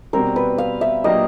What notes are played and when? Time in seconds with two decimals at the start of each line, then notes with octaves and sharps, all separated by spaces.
0.13 B2 G3 C4 A#4
0.36 B4
0.58 F5
0.81 E5
1.04 A#2 F#3 A#3 D4 G4 D#5